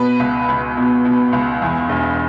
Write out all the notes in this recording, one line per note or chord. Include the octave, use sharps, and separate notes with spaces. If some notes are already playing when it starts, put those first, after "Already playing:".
Already playing: B2 B4
C#2
C#2
B2
B2
C#2
E2
E1